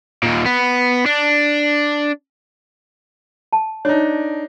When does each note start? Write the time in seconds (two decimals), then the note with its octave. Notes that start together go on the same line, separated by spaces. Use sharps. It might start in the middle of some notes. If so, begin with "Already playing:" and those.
0.23 D#2 A#2
0.46 B3
1.06 D4
3.53 A5
3.85 D4 D#4 C#5